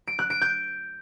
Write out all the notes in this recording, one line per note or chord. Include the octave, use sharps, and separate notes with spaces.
D7
F#6
D7
G6